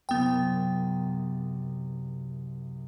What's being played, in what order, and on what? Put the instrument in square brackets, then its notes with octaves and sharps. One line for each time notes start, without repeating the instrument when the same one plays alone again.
[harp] C2 F#2 [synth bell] B3 G5